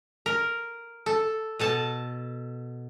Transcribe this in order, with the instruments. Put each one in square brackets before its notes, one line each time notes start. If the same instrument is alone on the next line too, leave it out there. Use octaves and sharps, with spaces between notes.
[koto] A#4
A4
B2 A4 A5